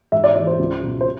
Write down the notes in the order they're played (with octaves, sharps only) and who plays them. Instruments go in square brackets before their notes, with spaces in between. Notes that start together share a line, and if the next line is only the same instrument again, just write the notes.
[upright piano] G#2 E5
D5
E3 D5
C5
C#2
B2 F#3
C5